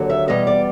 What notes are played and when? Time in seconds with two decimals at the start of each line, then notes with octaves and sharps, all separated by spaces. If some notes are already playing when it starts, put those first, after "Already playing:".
Already playing: D#2 D3 F#3
0.10 E5
0.28 E2 B2 G3 D#5
0.47 D5